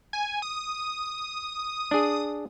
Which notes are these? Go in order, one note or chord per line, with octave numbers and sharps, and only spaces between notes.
G#5
D#6
D4 G#4